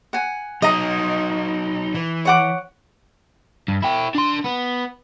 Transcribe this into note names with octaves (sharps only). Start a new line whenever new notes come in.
F#5 G#5
F#3 D#4 D#5 A#5
E3
C#5 F#5 D6
G2
E4 G5
D4 C6
B3